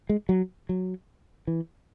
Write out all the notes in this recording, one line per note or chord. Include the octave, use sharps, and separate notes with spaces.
G#3
F#3
F#3
E3